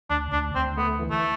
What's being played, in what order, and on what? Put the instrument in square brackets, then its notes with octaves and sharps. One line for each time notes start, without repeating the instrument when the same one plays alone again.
[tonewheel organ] D2 [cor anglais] D4
[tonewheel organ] D2 [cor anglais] D4
[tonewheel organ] D2 [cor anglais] C4
[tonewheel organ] A3 [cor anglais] B3
[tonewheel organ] E3
[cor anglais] A3